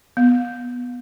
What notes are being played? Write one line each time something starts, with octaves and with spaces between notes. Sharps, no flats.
B3